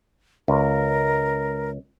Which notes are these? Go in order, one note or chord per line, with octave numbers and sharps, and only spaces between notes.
C#2 A#4